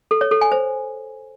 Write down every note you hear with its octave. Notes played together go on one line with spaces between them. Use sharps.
A4
C#5
A4
G#5
C5